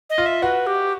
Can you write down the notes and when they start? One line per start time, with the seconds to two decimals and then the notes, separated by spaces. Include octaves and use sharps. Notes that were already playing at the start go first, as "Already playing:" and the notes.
0.10 D#5
0.18 F4
0.26 E5
0.42 F#4 B4
0.67 G4